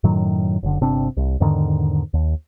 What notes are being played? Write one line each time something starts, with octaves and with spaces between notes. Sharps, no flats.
F#2 A2 D#3 F#3
F#1 D3
G1 C3 C4 D4
C2
E2 G#2 D3 D#3
D#2